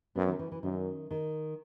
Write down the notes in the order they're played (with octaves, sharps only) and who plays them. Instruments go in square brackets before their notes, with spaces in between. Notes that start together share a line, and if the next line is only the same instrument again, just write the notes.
[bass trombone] F#2 [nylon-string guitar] B3
[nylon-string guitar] D#3
E3
E3
[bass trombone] F#2 [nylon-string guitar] D#3
[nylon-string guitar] D#3